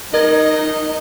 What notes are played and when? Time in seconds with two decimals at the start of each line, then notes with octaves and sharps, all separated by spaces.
0.14 D#4 A#4 D#5 G#6